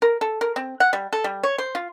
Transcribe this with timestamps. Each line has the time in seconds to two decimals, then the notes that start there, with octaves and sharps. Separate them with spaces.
0.02 A#4
0.21 A4
0.41 A#4
0.56 C4
0.80 F#5
0.93 G3
1.13 A4
1.24 G3
1.43 C#5
1.58 C5
1.75 F4